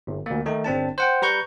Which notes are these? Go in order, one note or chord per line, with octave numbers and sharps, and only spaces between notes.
G1
D2 A#3
D#3 A3 D#4
G1 C4 D4 A5
C5 F#5 G5
G3 B4 A#5 C#6 G6